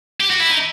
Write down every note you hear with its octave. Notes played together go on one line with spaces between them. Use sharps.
G4
F#4
E4
D#4